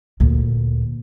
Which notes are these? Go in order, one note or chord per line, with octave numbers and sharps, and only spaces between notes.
D2 A#2